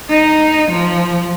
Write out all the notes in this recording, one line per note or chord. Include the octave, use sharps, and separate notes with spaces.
D#4
F3